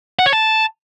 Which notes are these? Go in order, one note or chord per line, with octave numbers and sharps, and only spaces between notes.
F#5
C#5
A5